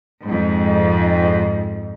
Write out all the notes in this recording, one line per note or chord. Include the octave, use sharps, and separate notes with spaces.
F2 G#2